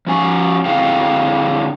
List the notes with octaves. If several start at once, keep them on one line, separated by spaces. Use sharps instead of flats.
F3 C#4 G#5
D3 C4 E4 G#4 F5 G5